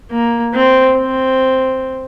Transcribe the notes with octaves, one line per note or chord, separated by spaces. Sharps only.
A#3
C4
C4